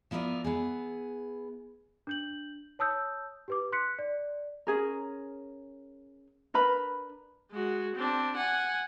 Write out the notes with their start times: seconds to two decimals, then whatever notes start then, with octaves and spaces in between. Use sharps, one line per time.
0.11 F3 B3 E4 A#4 D5
0.44 B3 E4 G#4
2.07 D4 G6 F#7
2.79 C#5 A5 D#6 E6 G6
3.48 G4 B4 D6
3.72 C6 F#6 B6 C#7
3.99 D5
4.67 C#4 G#4 A#4
6.54 D4 A#4 B4 B5
7.51 G#3 F#4
7.95 C4 D4
8.37 F#5 G#5